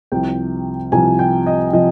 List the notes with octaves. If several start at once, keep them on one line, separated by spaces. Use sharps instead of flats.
C2 C3 F3 G5
C2 C3 F3 G#5
G5
D#5
C3 F3 D#5